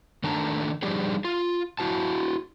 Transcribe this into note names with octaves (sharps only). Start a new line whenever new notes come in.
D#3 A3 D4 A5 A#5
F3 G3 D4 D#4 G4 G#4
F4
E4 F#4 A5